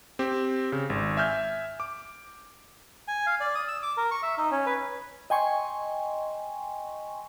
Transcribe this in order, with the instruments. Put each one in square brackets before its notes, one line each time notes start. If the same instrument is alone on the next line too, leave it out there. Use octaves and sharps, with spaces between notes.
[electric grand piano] C4 G4
C#3
G#1
E5 G#5 F6 G6
D6
[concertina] G#5
F5
D5
D#6
E6
D6
A#4
C#6
E5
D#4
C#4
B4
[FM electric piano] D#5 G5 G#5 C6 C#6